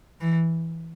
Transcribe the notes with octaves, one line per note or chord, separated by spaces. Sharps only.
E3